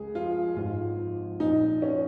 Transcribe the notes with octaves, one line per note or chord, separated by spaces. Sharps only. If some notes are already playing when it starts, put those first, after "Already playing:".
Already playing: C#2 G#4
F3 F4
G#1 F4
F3
A#1 D#4
F3 C#4